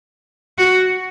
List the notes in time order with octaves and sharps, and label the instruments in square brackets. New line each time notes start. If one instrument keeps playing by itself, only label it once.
[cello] F#4